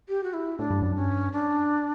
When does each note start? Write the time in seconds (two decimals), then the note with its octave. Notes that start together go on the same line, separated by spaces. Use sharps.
0.09 G4
0.24 F#4
0.33 E4
0.58 A2 D4
0.70 G2
0.82 F#2
0.95 G2 C#4
1.32 D4